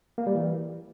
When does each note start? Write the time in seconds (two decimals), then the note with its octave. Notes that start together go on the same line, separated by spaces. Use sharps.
0.18 A#3
0.27 G3
0.35 E3